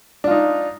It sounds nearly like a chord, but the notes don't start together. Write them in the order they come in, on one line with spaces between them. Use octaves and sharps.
D4 F4 D#4